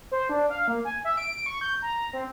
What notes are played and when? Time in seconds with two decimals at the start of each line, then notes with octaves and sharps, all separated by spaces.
0.11 C5
0.29 D4
0.50 F5
0.68 A#3
0.85 G#5
1.04 E5
1.17 D7
1.46 C#6
1.61 G6
1.82 A#5
2.13 C4